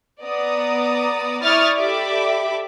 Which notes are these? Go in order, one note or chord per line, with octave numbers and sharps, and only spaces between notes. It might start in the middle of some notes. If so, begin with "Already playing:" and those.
B3 D5 A#5 D#6
E4 D5 C#6 D#6 F6 A6
G4 A4 D5 E5 B5 D6